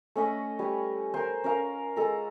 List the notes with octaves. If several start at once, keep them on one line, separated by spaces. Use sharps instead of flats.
A3 C#4 D#5 B5
G3 B4 C#5
A#4 C5 G#5
C#4 A#4 F5
G#3 A4 A#5